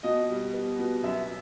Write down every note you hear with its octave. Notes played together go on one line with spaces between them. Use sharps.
B2 D#5
G3
B3
B2
F#2 E5